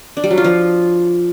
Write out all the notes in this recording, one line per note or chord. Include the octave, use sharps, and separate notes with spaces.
D4
G3
F#3
F4
F3